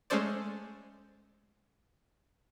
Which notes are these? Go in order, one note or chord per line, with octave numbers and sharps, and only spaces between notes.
G#3 A3 C#4 A4 C5 D5